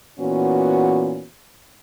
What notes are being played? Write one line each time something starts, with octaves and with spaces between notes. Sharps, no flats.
A#2 E3 B3 C#4 F#4